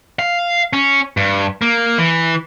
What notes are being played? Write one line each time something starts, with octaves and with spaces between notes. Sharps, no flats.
F5
C#4
G2
A#3
E3